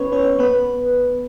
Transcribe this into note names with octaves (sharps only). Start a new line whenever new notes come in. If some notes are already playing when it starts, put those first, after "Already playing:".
Already playing: B3 C#4 B4 C#5
C#4 C#5
B3 B4